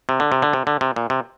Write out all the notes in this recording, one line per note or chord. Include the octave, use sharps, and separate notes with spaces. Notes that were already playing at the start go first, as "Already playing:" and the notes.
C3
D3
C3
D3
C3
D3
C3
A#2
C3